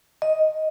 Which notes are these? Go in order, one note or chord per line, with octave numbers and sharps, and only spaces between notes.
D#5